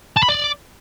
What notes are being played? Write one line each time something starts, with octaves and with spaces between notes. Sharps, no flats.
A5
B5
D5